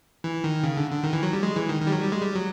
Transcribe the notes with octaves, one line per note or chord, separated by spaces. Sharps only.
E3
D#3
C#3
D3
D3
D#3
E3
F#3
G3
G#3
E3
D#3
D#3 G3
F#3
G3
G#3
G3
F#3